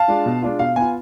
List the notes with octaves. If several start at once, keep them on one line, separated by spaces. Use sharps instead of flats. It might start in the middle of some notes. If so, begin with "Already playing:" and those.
Already playing: F5 A5
G#3 D4 F4
B2
G#3 D4 F4
B2 F5
B3 F4 G#5